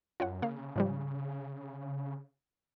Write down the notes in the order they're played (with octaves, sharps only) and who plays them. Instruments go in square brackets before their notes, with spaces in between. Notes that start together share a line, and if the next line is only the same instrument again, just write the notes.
[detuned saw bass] F#2 [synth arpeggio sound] F4 C#5 F#5
[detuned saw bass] C#3 [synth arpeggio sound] A#3 F5
[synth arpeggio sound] G#2 F3 G3